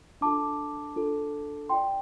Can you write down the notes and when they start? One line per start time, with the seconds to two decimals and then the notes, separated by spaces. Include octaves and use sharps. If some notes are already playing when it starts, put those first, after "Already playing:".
0.21 D4 F4 A4 A5 D6
0.96 D4 F4 A4
1.69 F4 D5 G5 C6